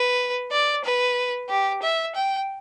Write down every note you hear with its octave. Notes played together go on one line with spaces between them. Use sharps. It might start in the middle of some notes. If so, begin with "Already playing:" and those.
Already playing: B4
D5
B4
G4
E5
G5